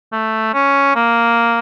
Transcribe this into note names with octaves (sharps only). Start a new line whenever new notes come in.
A3
C#4
A#3